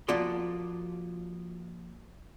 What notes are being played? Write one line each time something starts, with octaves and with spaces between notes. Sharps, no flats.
F3 A#3 F4 F#4 D5 C6